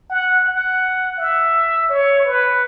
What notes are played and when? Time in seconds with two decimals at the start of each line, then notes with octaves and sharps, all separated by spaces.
0.10 F#5
0.47 F#5
1.18 E5
1.89 C#5
2.26 B4